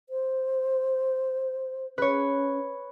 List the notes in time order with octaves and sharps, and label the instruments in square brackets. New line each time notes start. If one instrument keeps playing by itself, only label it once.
[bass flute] C5
[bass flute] C#4 [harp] B4 C#5